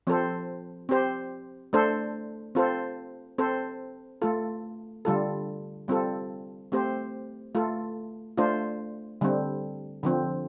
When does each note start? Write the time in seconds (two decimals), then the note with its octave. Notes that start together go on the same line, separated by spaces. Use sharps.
0.07 F3 C4 A4 C5
0.89 C4 G4 C5
1.73 A3 D4 A4 C5
2.55 C4 F4 A4 C5
3.38 C4 A4 C5
4.22 A3 F4 A4
5.05 D3 G3 F4 A4
5.88 G3 C4 F4 A4
6.72 A3 C4 G4 C5
7.55 A3 F4 A4
8.37 A3 D4 F4 C5
9.21 D3 G3 C4
10.03 D3 F3 C4